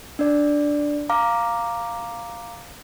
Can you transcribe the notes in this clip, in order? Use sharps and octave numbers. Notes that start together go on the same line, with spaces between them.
D4 D5
F5 A#5 D6